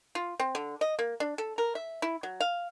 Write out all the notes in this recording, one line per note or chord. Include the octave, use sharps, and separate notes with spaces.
F4
C4
D3
D#5
A#3
D4
A4
A#4
E5
E4
F#3
F5